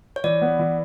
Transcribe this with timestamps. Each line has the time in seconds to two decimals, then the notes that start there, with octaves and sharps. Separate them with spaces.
0.16 C#5
0.24 E3 D5
0.42 B3
0.59 E3